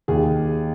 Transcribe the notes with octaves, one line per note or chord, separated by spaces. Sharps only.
D#2 G#4